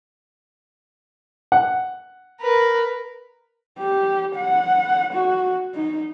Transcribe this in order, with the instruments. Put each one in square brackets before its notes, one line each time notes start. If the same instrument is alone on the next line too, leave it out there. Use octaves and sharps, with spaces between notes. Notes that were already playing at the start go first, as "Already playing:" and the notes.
[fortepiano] F#5
[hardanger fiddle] A#4 B4
[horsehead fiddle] G4
F#5
F#4
D#4